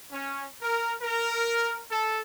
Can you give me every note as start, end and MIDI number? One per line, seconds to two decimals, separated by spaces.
0.12 0.44 61
0.62 0.93 70
1.02 1.79 70
1.90 2.21 69